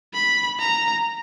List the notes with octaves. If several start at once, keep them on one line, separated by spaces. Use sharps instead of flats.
B5
A#5